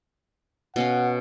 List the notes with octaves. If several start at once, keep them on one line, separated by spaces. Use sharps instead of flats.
B2 C#4 F5 F#5